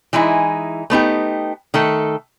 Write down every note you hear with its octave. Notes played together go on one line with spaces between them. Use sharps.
E3 G#3 D#4 E4
A3 B3 D#4 G4
D#3 A3 A4